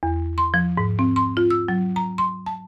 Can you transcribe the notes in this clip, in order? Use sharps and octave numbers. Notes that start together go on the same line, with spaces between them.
E2
C6
F3
G#2
C4
C6
F4
E6
F#3
A#5
C6
A5